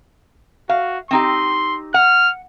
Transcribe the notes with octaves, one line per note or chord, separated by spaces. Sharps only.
F#4 F5
C4 D#4 G4 C6
F#5 F6